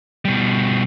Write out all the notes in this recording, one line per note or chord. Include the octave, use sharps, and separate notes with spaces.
B2 G3